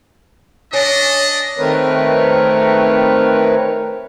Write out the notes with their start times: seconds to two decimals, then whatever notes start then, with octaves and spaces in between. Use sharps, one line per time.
0.73 C#4 D4 D5 D#5
1.58 D#3 A3 C4 A#4 B4 C#5